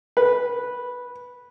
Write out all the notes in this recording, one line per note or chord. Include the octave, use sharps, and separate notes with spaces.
B4